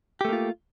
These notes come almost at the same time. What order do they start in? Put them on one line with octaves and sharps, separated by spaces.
G4 A3 A#3 F4